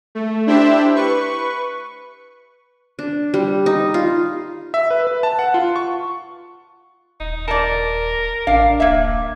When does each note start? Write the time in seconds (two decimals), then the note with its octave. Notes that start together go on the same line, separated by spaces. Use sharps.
0.15 A3
0.47 D4 E4 G4 C5 E5
0.95 B4 C#6
2.99 D4
3.34 G3
3.66 D#4
3.94 F4
4.74 E5
4.90 B4
5.07 B4
5.23 A5
5.39 F#5
5.54 F4
5.76 C#6
7.20 D#1 D#4
7.48 A#4 D5 A5
8.47 A1 D4 F5
8.80 D1 A#3 E5